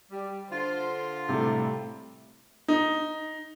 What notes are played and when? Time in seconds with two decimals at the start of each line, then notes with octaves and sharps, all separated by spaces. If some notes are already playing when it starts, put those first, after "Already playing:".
0.11 G3
0.51 D3 F4 C5
1.29 A2 C3 G3 A3
2.68 D#4